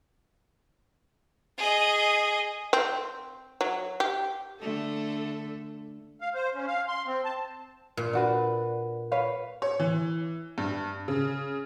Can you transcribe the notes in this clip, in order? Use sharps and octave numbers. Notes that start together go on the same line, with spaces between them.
G#4 D#5
C4
F#3
G4
D3 A3 A4
F5
C5
C#4
F5
C6
C4
A5
A#2
D4 F#4 B4
B4 C#5 F5
C#5
E3
G2
C#3